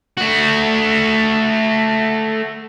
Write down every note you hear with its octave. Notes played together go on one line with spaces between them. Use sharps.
A3 F#4